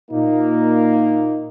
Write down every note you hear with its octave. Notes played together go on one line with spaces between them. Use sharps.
A#2 A#3 D#4